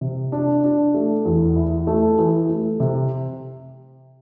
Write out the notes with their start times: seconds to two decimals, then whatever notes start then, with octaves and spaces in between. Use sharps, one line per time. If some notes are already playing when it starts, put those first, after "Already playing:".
0.01 C3
0.32 D4
0.64 D4
0.94 A3
1.25 E2
1.56 E4
1.87 A3
2.18 E3
2.49 A3
2.80 C3